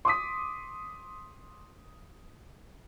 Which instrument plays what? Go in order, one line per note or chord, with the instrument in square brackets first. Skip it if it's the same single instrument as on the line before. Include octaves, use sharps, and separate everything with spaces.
[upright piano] C6 D6 D#6 B6